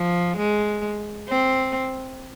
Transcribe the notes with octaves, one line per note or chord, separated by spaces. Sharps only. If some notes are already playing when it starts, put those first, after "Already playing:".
Already playing: F3
G#3
C4